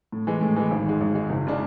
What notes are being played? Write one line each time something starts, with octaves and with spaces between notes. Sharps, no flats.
A2
E3 G#3
A2
E3 G#3
G#1
G#2 G#3
G#1
G#2 G#3
F#1
C#3 G#3 D4